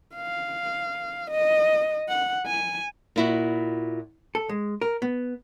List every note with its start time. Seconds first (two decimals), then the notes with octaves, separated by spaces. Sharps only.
0.15 F5
1.31 D#5
2.08 F#5
2.46 G#5
3.16 A#2 E4 F#4
4.35 A4
4.49 G#3
4.81 A#4
5.02 B3